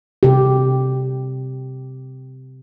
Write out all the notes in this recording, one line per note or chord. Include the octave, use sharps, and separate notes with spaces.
C3 G4